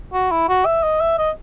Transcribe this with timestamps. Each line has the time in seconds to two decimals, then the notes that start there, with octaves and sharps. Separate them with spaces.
0.13 F#4
0.32 E4
0.49 F#4
0.66 E5
0.83 D#5
1.01 E5
1.18 D#5